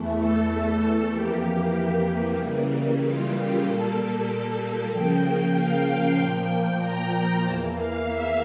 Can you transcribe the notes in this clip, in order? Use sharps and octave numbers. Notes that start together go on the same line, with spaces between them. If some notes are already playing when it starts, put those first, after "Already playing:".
Already playing: E2 E3 A3
A4
F2 E3 A#3 G4
C#3 E3 G3 A#3
F4
G4
A#2 G3 A#3 A4
C#3 F3 A#3 G5
F5
A#2 F3 A#3 G5
A#5
E2 E3 A#3 A5
F5
E5